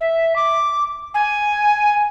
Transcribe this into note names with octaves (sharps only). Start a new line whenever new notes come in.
E5
D6
G#5